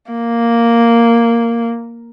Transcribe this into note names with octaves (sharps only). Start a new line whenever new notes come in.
A#3